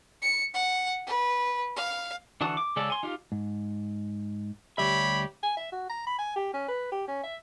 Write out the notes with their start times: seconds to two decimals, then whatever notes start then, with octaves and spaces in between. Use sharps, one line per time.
0.22 C#7
0.54 F#5
1.07 B4
1.76 F5
2.41 D3 E3 F#4 A5 D#6
2.57 D6
2.76 C#3 G#3 C#4 A4 D5
2.90 G#5 C6
3.03 D#4 F4 G4 F5
3.32 G#2
4.78 D2 G3 G4 C#5 E5 B5
5.43 G#5
5.57 E5
5.72 F#4
5.89 A#5
6.07 B5
6.18 G#5
6.36 G4
6.54 C#4
6.68 B4
6.92 G4
7.08 C#4
7.24 E5